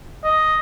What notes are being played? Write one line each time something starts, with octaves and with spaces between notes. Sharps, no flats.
D#5